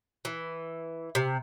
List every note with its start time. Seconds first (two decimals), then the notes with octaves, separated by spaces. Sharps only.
0.25 E3
1.15 C3